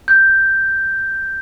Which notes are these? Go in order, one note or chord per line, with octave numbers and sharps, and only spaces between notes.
G6